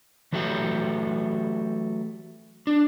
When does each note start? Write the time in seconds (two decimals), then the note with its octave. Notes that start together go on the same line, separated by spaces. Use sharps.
0.33 E3 F#3 A3 G4
2.67 D4